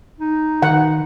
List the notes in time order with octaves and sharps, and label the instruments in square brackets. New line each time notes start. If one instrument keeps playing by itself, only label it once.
[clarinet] D#4
[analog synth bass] D#3 [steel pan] F#5